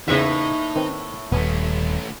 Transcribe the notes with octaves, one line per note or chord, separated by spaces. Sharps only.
E2 A2 C#3 A#3 D#4 E5
D#3 C4 B4
D#1 A3 B3 C#4 G#5